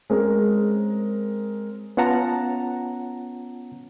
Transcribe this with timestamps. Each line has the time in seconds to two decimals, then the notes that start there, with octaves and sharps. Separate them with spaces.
0.10 G#3 C4 C#4 G#4 A#4
1.97 B3 C#4 F4 F#5 A5 A#5